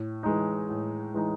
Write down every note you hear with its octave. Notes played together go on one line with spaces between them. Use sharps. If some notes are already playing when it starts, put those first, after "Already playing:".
Already playing: A2
E3 G#3 D#4
A2
E3 G#3 D#4